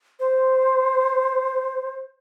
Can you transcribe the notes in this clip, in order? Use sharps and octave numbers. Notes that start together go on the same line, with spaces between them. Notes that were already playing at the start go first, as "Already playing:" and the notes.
C5